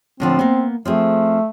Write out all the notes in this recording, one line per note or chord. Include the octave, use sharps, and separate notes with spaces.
A2 D3 F3 C4
A#3 B3
F3 A3 C4 G#4